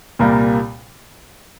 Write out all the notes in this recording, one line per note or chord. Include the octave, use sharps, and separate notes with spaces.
C2 A#2 G3 A#3